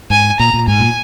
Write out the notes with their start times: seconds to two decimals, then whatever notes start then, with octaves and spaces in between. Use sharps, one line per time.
0.10 G#2 G#5
0.39 A#2 A#5
0.54 A#2
0.68 G#2 G#5
0.80 A#2